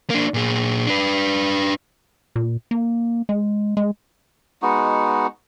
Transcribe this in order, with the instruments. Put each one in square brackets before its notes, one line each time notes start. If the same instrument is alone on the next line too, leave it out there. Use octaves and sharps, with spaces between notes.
[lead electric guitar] A#3 D4
A#2 G#4
D4 B4
[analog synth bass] A#2
A#3
G#3
G#3
[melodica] G#3 B3 D#4 F#4